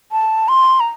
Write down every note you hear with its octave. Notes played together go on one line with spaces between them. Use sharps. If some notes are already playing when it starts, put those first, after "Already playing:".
A5
C6
A#5